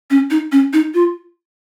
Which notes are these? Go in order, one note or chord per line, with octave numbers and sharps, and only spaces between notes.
C#4
D#4
C#4
D#4
F4